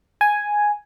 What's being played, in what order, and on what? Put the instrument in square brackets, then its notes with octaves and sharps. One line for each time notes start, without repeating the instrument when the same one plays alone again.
[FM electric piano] G#5